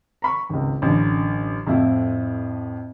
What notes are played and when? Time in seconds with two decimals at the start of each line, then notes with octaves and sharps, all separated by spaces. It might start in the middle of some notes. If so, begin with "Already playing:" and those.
0.22 A#5 B5 C#6
0.50 G#1 C#2
0.82 A1 F#2 D3
1.66 F2 A2 C4 E4 F4